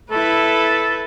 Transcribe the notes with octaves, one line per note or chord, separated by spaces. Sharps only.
E4 A4 B4